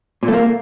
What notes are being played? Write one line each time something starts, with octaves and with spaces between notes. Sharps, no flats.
A#2
A3
A#3